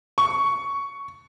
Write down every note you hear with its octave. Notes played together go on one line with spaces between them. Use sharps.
C#6